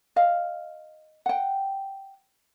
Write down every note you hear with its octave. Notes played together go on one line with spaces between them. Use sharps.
D#5 F5
F#5 G5